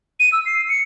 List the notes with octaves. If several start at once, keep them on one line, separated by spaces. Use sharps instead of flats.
D#7
E6
C7
C#7